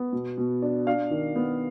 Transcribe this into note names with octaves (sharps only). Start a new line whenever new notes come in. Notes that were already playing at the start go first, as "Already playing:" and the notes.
Already playing: B3
B2
B2
D4
D4 F5
D#3
B3